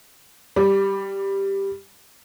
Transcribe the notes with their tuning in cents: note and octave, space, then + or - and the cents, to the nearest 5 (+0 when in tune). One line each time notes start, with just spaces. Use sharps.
G3 +0 D6 -25